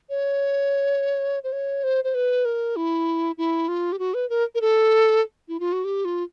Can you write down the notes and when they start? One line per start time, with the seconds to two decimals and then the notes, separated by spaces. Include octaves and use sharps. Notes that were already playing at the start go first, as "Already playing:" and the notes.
0.10 C#5
1.44 C5
1.52 C#5
1.83 C5
2.04 C5
2.14 B4
2.45 A#4
2.76 E4
3.38 E4
3.68 F4
3.92 G4
3.99 F#4
4.14 B4
4.30 A#4
4.55 A#4
4.61 A4
5.48 E4
5.60 F4
5.72 F#4
5.84 G4
6.05 F4